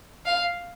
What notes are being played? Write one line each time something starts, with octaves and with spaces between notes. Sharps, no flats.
F5